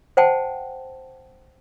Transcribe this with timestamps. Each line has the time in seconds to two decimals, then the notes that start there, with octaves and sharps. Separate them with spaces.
0.17 C5 F#5 G5 A5